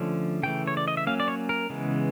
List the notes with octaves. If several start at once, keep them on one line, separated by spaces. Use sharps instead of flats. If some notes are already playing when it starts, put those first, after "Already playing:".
Already playing: D3 F3 A3 C#4
C#3 E3 A3 G5
C#5
D5
D#5
E5
F#3 A#3 C#4 F5
D5
C#5
A#4
C#3 E3 G#3 B3